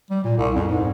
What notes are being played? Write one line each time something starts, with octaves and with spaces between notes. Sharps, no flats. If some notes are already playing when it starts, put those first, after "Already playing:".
G3
A#2
C2
F2
G#2